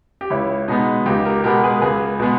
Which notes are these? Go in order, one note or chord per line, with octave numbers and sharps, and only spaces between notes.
G4
C#2 C#4 E4
B2 G#3 B3 D#4
C#2 D#4 G4
G4 A#4
B2 G#3 B3 G4 A#4
G#4 B4
A#4
C#2 G#4 B4
B2 G#3 B3